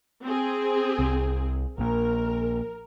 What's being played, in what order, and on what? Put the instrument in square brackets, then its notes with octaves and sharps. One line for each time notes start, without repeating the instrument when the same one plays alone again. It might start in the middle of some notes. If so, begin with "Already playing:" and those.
[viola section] C4 G#4
[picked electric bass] C2
[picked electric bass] A#1 A#2 [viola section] A#4